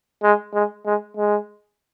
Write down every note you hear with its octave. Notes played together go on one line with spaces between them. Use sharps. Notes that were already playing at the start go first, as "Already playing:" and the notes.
G#3
G#3
G#3
G#3